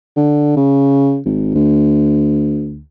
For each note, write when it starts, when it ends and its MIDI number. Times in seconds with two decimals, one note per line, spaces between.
0.17 0.55 50
0.57 1.20 49
1.25 1.54 32
1.55 2.81 38